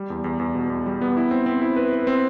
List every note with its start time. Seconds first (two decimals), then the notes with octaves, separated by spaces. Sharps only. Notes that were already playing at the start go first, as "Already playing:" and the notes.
Already playing: G3
0.10 E2
0.24 E2
0.39 E2
0.55 B2
0.70 E2
0.86 G3
1.01 B3
1.17 E4
1.31 C4
1.46 C4
1.62 E4
1.76 B4
1.93 B4
2.07 C4